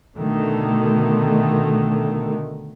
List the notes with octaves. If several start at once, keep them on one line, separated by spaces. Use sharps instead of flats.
B2 D3 D#3 A3